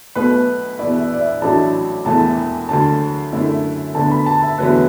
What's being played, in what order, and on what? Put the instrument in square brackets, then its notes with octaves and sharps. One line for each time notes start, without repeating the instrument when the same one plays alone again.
[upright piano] B1 B2 A3 [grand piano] B4
[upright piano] E2 B2 B3 E4 [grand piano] D5
[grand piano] E5
D5
E5
[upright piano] A1 A2 F#3 A3 D4 [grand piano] A5
[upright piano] E1 E2 E3 A3 [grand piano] A5
[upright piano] D2 D3 F#3 [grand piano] A5
[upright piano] F#2 D3 A3 E4
[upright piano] D2 D3 B3 [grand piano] A5
[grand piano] B5
A5
E5
[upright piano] E2 D3 F#3 A3 [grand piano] B4